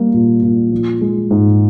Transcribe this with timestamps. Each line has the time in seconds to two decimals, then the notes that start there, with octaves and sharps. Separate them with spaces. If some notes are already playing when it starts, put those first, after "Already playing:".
Already playing: G3 A#3
0.14 A#2
0.42 A#2
0.72 F3
1.01 G#3
1.31 G#2